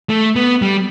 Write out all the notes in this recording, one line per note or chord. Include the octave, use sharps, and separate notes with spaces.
A3
B3
G3